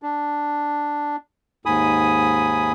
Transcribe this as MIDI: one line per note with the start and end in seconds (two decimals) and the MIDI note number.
0.03 1.16 62
1.66 2.72 39
1.66 2.72 44
1.66 2.72 80
1.66 2.72 83
1.66 2.72 87